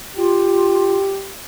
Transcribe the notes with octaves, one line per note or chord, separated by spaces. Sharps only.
F4 G4